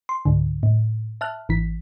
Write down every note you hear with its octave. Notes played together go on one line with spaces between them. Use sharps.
C6
C#2 G#2 D3
A2
E5 A5 F6 F#6
G#1 E3 B6